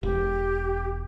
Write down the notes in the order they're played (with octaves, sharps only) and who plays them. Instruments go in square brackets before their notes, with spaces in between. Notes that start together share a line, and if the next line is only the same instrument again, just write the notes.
[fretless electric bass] E1 [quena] G4